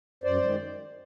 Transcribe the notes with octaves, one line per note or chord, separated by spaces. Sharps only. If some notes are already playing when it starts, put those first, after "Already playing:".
F#2 C5 D5
D#3 G#3